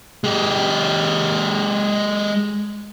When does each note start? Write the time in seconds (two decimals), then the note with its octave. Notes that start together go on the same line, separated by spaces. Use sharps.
0.24 G#3 G4